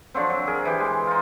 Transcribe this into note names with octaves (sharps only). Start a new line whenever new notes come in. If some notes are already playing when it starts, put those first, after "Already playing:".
D3 F3 F#3 C4
F#3
G#4 A#4
E3 G4
G#3
D#4 F4